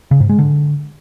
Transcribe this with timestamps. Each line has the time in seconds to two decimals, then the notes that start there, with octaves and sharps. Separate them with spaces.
0.11 C#3
0.20 G#2
0.29 G#3
0.39 D3